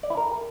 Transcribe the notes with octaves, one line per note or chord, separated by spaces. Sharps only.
D5
E4
A#4